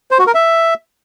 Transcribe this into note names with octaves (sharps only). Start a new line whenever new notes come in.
C5
F#4
A#4
E5